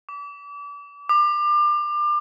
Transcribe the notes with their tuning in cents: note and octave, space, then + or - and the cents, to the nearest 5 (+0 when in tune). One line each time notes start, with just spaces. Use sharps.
D6 -35
D6 +30